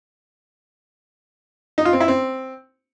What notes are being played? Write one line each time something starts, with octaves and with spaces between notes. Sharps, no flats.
D#4
F4
C4
E4
C4